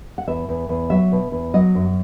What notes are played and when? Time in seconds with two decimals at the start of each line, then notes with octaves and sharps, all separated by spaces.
0.18 F#5
0.27 E2 E5
0.49 E2
0.69 E2
0.90 F#3 E5
1.12 B2
1.32 E2
1.54 F#3 D#5
1.75 F#2